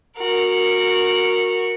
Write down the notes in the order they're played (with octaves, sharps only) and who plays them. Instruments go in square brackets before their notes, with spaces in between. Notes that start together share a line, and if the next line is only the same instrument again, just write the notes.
[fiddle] F#4 A#4